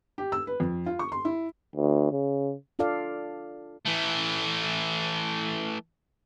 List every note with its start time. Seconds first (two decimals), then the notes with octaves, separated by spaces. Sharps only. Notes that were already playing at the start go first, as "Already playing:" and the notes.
0.18 G4
0.32 E6
0.47 B4
0.60 F2
0.86 F4
0.99 C#6
1.12 C6
1.25 E4
1.76 D2
2.12 C#3
2.79 D4 F4 A4 D5 F5
3.86 E3 A3